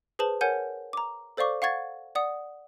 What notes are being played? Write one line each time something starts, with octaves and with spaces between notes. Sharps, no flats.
G#4 B4 C5 A5 F#7
A#4 C#5 F#5 G#5 G6 D#7
A#5 D6
A4 C5 D5 F5 C#6 D6
F5 F#5 C#6 G#6 A6
D5 F#5 D#6